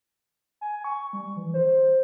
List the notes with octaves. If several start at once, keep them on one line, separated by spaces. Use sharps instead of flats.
G#5
C#6
G3
E3
C5